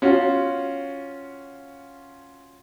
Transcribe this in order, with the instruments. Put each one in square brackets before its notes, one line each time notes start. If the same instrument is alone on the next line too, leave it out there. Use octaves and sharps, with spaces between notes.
[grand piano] C#4 F4 F#4